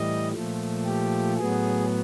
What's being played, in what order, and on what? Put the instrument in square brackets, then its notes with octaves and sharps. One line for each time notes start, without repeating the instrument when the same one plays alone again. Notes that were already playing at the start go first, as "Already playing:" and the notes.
Already playing: [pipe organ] A2 E3 G3 D#5
A#2 F3 A3
G4
A2 F#3 B3 G#4